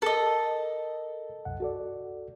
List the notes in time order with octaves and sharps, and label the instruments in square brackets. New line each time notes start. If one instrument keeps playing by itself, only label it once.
[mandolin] A4 D#5 [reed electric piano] A#4 A5
[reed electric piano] C2 F#2 F#5
F#4 A4 D5